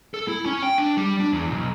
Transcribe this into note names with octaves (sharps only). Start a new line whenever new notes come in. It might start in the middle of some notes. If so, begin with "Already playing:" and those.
A4
E4
C#4
G5
D4
G3
D4
E2
B1